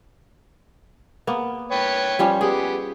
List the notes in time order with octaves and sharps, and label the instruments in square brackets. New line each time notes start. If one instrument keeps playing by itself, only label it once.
[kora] A#3 B3
[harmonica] B4 C#5 G5
[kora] F3 G3 C#4
[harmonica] B3 G4 [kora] G#4